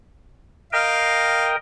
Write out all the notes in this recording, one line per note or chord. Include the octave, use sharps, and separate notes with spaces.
A#4 D#5 F5 G5